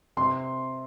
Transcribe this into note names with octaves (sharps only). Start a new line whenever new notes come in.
C3 C6